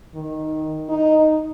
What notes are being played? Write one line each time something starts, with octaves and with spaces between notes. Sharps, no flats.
D#3
D#4